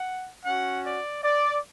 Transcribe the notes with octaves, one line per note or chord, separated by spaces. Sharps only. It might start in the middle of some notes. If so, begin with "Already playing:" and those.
Already playing: F#5
C#4 F#4 F#5
D5
D5